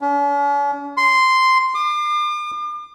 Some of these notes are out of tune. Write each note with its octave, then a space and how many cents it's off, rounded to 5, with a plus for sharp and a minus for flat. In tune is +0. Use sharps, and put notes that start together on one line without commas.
C#4 +45
C6 -10
D6 +40